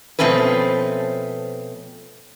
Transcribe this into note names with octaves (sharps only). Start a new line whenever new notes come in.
B2 F3 A3 C4 C#4 B4